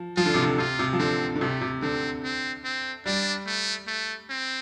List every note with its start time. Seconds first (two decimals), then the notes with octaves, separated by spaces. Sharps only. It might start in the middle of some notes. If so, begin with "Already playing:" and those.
Already playing: F3
0.17 F3 F4
0.26 D3
0.34 C3
0.42 D3
0.58 C3 F4
0.79 C3
0.93 F3
0.99 D3 C4
1.36 D3
1.41 C3 A3
1.61 C3
1.82 D3 C4
2.24 C4
2.64 C4
3.06 G3 D4
3.47 A3
3.88 A3
4.30 C4